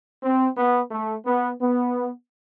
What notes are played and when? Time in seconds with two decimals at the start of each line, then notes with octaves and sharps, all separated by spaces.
0.23 C4
0.57 B3
0.91 A3
1.26 B3
1.61 B3